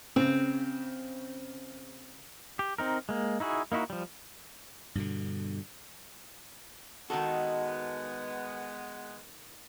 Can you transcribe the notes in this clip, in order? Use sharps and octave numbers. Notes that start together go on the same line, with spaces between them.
C#3 C4
G4
C4 D#4 A#4
G#3 A#3
D#4 E4 F#4 G#4
A#3 D#4 E4 F#4
F3 G3
G2 B2 D3
D#3 G#3 B3 D#4 F#4 A4 D#5 A5